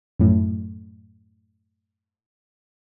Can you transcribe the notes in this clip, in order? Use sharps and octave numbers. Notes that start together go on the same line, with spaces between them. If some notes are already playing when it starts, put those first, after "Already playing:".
F#2 A2